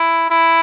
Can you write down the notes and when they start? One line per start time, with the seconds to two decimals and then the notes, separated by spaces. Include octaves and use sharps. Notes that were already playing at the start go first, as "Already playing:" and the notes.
Already playing: E4
0.30 E4